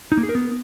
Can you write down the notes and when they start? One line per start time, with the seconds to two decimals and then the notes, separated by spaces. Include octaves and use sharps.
0.12 D#4
0.17 A#3
0.23 G#4
0.29 A#4
0.35 B3